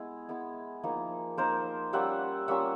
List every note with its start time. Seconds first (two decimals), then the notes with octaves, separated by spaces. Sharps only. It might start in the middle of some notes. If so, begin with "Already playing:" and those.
Already playing: G#3 B3 E4 G#4
0.29 G#3 B3 E4
0.83 F3 A#3 D#4
1.38 F3 A#3 D#4 A#4 C5
1.93 G3 A#3 C#4 F4 E5 F#5
2.48 G3 A#3 C#4 F4 E5 F#5